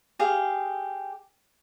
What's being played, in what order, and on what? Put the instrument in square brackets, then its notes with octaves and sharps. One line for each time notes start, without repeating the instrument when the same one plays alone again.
[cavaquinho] G4 G#4 F5